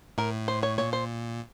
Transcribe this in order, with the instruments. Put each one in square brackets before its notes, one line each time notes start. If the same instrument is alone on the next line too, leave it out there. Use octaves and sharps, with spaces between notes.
[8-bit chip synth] A2 [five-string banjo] A#4
[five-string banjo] C5
C#5
[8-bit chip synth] A#2 [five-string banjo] C#5
[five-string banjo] C5